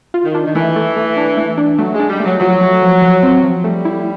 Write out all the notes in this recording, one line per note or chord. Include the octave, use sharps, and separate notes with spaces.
F4
D#3
D4
D#3
E3 A3
A3
A3
D4
A3
D4
F#3 A3
G#3
D4
G3
F#3 A3
F3 F#3
A3
F3
F3
C4
F3
G3 A3
E4